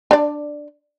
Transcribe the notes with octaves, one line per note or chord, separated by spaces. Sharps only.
D4 D5